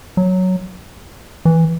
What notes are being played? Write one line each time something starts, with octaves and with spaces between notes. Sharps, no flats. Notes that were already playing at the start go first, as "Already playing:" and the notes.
F#3
E3